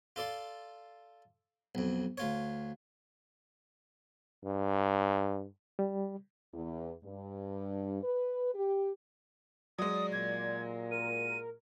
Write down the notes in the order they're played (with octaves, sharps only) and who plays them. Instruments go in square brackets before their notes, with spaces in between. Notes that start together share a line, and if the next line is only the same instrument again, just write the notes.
[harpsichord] F4 A4 D5 C6
B1 F2
D2 F4 C#5
[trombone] G2
[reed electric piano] G3
[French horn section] E2
G2
B4
G4
[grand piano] F#3 G#3 [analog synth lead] D5 [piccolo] D#6
[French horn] A#2 [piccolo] G#6
[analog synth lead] A#4 [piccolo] D#7